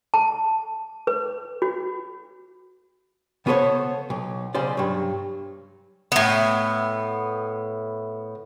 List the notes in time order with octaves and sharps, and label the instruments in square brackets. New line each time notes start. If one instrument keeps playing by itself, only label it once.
[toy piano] A5
B4
F#4
[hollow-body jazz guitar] C#3 B3 F#4 A4 C5 C#5
B1
B1 C#3 C5 D5
G2 F#3
[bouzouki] A2 B3